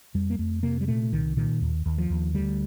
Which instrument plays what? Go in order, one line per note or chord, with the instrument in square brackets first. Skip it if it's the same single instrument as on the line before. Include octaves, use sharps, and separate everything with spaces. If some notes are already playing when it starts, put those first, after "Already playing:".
[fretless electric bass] F2 G3
A#3
F2 A3
C3 A#3
G3
A#2 A3
C2 D#3
A#2 D#3
D#2
D#2
F3
D#2
D2 G3